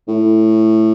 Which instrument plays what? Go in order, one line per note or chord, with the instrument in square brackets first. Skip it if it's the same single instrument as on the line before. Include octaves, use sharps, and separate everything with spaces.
[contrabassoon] A2